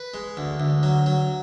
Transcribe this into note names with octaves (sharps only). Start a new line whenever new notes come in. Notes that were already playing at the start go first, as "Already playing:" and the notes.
Already playing: B4
G#3
D2
D2
F#3
F#3